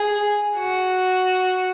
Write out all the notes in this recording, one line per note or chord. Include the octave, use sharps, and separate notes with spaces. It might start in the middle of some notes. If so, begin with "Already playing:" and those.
Already playing: G#4
F#4